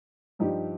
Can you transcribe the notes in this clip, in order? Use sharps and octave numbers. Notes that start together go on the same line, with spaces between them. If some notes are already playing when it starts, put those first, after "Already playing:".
G2 F3 D#4 G4